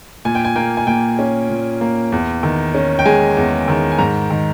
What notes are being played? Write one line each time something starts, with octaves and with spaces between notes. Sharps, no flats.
A#2 G#5
G5
G#5
A#3 G5
G#5
A#2 G5
C#4
A#2
A#3
E2
D#3
C#4
G5
G#3 G#5
E2
D#3
G#5
G#2 A#5
D#3